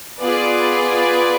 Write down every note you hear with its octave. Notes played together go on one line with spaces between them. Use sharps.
B3 F4 G#4 B4 D5